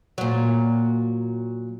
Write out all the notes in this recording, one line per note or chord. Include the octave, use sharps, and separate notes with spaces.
A#2 F#3